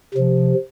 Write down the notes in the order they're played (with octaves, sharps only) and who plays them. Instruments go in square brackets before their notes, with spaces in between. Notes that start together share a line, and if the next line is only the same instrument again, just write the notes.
[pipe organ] C3 F3